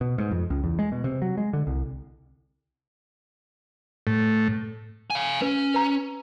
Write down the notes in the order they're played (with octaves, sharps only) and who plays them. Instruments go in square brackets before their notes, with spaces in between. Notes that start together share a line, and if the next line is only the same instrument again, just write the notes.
[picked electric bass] B2
G#2
F2
C#2
E2
G#3
B2
C3
F#3
G#3
D3
C2
[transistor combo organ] A2
[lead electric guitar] F5 G#5
[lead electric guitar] C#4 [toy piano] B4
[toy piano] B4 A#5